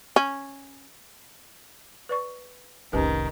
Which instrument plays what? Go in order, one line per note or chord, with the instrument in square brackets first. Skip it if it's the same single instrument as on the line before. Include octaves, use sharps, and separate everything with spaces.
[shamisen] C#4
[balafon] B4 D5 C#6
[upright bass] F1 C2 [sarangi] D#3 [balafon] C#4 G4 B4